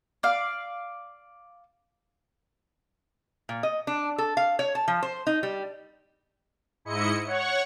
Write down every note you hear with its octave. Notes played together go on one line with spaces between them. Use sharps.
D5 F5
A#2
D#5
D4
A4
F5
C#5
A5
F3
C5
D#4
G3
G#2 E4 D#5 C#7
C#5 F#5 C#6